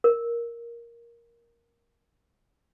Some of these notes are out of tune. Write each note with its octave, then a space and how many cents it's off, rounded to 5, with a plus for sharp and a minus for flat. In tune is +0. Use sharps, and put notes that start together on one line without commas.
A#4 +5